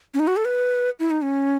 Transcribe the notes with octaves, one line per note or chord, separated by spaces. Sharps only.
C#4
D#4
F#4
A4
B4
E4
D#4
C#4